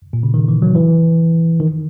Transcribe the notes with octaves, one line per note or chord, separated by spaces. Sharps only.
A#2
C#3
D#3
E3
F#3
E3
D#3